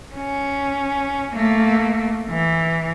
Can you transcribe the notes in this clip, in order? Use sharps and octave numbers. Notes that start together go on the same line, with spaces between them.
C#4
A3 A#3
E3